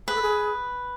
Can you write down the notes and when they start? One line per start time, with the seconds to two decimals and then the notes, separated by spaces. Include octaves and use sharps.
0.07 G#4 B4
0.15 A4
0.22 G#4